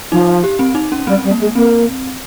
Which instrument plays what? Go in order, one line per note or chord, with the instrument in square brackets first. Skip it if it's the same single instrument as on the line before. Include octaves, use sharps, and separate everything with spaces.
[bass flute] F3 [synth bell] D#4
[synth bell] G4
C4
D#4
C#4
[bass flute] G3 [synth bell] C4
[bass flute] G3
[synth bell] A#3
[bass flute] G#3
[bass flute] A#3 [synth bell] C4